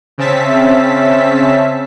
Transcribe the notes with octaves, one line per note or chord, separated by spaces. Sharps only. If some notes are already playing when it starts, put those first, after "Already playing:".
C#3 C4 C#4 E5 A5 B6